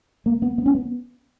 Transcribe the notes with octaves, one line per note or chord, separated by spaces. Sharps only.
A#3
B3
B3
C#4
B3